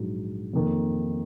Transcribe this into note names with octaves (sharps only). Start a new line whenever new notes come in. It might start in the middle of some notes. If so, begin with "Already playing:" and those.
Already playing: A#1 G#2 F#3
F2 D#3 A#3